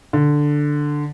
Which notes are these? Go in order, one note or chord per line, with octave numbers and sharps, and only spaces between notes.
D3